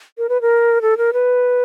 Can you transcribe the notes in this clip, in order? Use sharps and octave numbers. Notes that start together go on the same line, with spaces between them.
A#4
B4
A#4
A4
A#4
B4